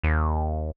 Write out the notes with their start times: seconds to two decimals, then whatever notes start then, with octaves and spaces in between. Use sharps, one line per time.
0.03 D#2